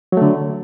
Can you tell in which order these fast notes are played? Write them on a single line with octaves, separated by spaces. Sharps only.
F#3 A3 D3